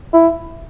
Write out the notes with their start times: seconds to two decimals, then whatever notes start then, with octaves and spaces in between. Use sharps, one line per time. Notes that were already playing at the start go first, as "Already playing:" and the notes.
0.13 E4